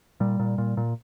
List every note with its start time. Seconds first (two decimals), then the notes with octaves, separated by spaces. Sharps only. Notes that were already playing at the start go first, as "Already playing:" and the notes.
0.20 A#2 G3
0.39 A#2
0.58 A#2
0.77 A#2